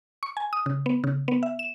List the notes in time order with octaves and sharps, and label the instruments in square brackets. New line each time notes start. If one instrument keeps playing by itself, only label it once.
[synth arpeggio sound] C#6
G#5
D#6
C#3
B3
C#3
B3
E5
E7